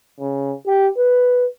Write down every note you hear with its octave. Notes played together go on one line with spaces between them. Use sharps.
C#3
G4
B4